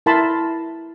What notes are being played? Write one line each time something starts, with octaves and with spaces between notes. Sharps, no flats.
E4 A#4 A5 B5 C6